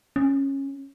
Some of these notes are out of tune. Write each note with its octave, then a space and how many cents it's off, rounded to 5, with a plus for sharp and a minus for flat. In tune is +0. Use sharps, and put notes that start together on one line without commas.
C#4 -15